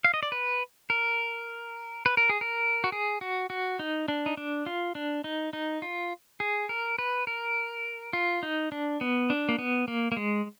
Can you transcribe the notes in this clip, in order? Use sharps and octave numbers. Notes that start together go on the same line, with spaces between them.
F5
D#5
D5
B4
A#4
B4
A#4
G#4
A#4
F#4
G#4
F#4
F#4
D#4
D4
D#4
D4
F4
D4
D#4
D#4
F4
G#4
A#4
B4
A#4
F4
D#4
D4
B3
D4
A#3
B3
A#3
A#3
G#3